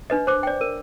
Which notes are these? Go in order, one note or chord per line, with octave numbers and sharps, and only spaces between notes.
D4 B4 D#5
C5 D6
D5 G5
A#4